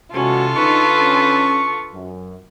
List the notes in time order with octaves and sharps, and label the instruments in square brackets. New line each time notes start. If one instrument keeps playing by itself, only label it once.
[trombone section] E2 G#3 F#4 [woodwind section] C3 [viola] C#4 [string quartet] F4 A4
[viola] D3 B4 [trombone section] D#4 [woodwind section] C#6
[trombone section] C#4
F#2